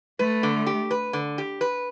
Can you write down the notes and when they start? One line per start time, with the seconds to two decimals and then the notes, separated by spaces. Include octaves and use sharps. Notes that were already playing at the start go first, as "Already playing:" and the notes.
0.19 A3 B4
0.43 D3
0.67 G4
0.91 B4
1.13 D3
1.38 G4
1.61 B4